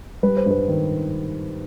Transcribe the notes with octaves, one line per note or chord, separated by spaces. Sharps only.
G3 B4
C5
G2 B4
D#3